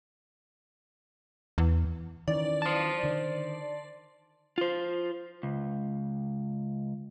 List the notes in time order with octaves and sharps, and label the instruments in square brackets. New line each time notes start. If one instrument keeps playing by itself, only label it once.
[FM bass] E2
[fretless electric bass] D#3 E3 C#4 [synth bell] D5
[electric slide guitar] C5 A5
[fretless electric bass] D3 D#3
[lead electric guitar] F4 C5
C#2